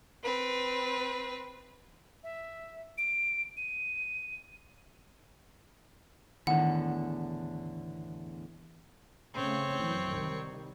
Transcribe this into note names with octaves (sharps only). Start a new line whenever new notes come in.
C4 B4
E5
D7
D#7
E2 A2 D3 D#3 F#5
C#3 A3 C4 C#5
F#2 E3
C2 D#3 G3